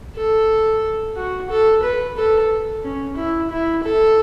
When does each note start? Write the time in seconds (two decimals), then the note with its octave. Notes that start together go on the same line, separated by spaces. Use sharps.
0.16 A4
1.17 F#4
1.50 A4
1.83 B4
2.17 A4
2.84 C#4
3.16 E4
3.50 E4
3.83 A4